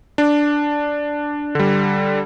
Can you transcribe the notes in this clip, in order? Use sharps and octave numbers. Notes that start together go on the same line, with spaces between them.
D4
D3 G3